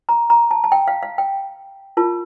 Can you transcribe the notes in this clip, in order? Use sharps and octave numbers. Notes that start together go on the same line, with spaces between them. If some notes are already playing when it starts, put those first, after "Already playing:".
A#5
A#5
A5
A5
G5
F5
F5
G5
F4 A#4 A5